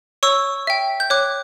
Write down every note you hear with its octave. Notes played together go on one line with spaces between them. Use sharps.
C#5 C#6 E6
E5 G5
G6
C#5 D6 F#6